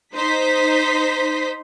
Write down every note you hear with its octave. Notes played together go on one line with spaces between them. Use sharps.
D#4 C5 B6